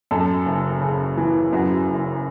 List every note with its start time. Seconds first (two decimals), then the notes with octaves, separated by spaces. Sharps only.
0.11 F#2 A4
0.46 F#1
0.81 C#3
1.17 E3
1.53 F#2 F#4
1.89 F#1